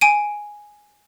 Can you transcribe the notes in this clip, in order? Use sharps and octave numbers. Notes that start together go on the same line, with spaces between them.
G#5 D7 D#7